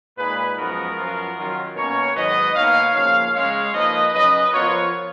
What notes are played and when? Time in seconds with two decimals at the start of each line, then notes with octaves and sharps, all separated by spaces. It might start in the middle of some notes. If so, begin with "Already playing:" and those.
0.18 A#2 G#3 D#4 G#4 B4
0.58 F#2 F3 G#3 B3 D#4 F#4 A#4
0.97 F#2 F3 B3 F4
1.37 D#3 F#3 C#4 F4
1.76 B2 A#3 C#4 A#4 C#5
2.16 G#2 D#3 F#3 B3 B4 D#5
2.55 B2 A#3 D#4 C#5 F5
2.95 C#3 F3 A#3 C#5 F5
3.35 C#3 G#3 C#4 C#5 F5
3.74 F3 A#3 D#4 B4 D#5
4.14 C#3 F#3 C#4 B4 D#5
4.53 F3 B3 F4 A#4 C#5